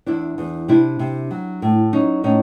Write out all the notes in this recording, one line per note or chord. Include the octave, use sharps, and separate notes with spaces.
E2 D4 E4
E2
C3 D4 E4
C3
F#3
A2
F#3 C#4 D#4
A2 C#4 D#4